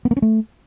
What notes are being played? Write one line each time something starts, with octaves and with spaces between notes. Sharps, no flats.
B3
A#3
C#4
A3